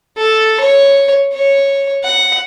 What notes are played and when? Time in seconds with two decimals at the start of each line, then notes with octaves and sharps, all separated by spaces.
0.17 A4
0.60 C#5
1.33 C#5
2.03 F#5